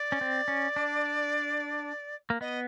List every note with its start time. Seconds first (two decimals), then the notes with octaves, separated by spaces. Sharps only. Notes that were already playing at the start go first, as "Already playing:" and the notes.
Already playing: D5
0.12 C#4
0.21 C4
0.48 C#4
0.76 D4
2.30 A#3
2.41 B3 D#5